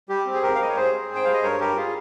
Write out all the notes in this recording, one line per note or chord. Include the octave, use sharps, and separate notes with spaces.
G3 G4
C4
G#4
G#2 G4 A#4
F5
G3 D#5
C#5
G#2 G#4 C5
C4
G#2
G5
G3 F5
D#5
G2 A#4 C#5
G3 G4 A#4
F4 G#4